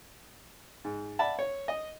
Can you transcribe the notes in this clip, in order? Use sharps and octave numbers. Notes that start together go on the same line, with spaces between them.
G#2
D5 E5 F#5 A5 B5
C#5
D#5